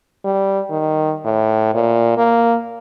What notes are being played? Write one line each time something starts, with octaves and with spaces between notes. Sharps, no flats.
G3
D#3
A2
A#2
A#3